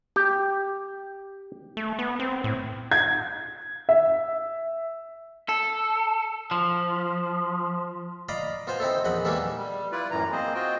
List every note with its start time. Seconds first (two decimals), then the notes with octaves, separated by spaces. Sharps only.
0.16 G4 G5
1.77 A3
1.99 B3
2.20 C4
2.44 A2
2.92 G#6
3.89 E5
5.49 A4
6.51 F3
8.29 D5 D#5 F5 A#5 B5
8.67 B3 F4 C5 F5 G#5
8.80 C4 D#4 E4 A4
9.04 A#1 E2 D#5 F#5 B5
9.25 D#3 E3 G3 A#3 B3 A4
9.57 G3
9.92 E4 F4 B4 D5
10.11 F#2 A2 E3 A#5
10.32 A#3 C4 G#4 C5 D#5
10.55 F4 F#4 C5 D#5 G5